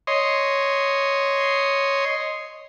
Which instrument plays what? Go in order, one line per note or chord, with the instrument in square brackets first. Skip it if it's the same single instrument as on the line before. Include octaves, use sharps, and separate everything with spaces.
[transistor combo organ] C#5 D#5 C6